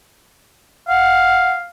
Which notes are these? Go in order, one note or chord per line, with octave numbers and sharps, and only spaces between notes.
F5 F#5